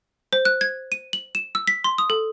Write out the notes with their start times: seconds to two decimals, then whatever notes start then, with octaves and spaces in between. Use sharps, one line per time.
0.33 C5
0.45 F#6
0.61 G#6
0.92 D#7
1.13 F#7
1.35 E7
1.55 E6
1.67 B6
1.84 C6
1.98 D#6
2.10 A4